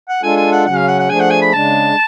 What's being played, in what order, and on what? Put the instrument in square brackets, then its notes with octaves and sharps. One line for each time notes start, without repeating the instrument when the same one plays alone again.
[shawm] F#5
[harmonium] G#3 D4 F4 A4 [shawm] G#5
[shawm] G#5
F#5
[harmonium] C#3 F#3 C#4 [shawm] F#5
[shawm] F5
F#5
F#5
[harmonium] F3 A3 D4 G#4 [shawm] G#5
[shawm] F#5
G#5
B5
[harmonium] C#3 G#3 D4 [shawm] A5